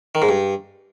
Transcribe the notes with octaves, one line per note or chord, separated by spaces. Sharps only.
D#3
G#2
G2